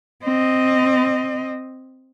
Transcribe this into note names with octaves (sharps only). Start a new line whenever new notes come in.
C4 D#5